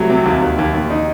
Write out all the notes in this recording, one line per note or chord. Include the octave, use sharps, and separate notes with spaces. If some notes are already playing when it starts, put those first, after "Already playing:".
Already playing: C2 F#3 A3
C3
D#2
D#2
D#2
D#2
D#4